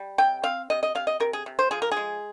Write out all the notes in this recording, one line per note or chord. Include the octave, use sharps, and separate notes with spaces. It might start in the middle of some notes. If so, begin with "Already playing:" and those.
Already playing: G3
C3 G5
C4 F5
C3 D#5
D#5
C3 F5
D#5
C3 A#4
G#4
C3
C5
F3 G#4
A#4
G#4
G#3